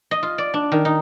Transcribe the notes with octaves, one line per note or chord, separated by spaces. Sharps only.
D#5
F4
D5
D4
D#3
D#4